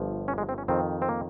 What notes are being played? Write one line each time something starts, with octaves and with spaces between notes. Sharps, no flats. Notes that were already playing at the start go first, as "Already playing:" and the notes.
Already playing: G1 G2 F3
C#4
G#3
C4
C#4
F2 D#3 C4
C4
A#3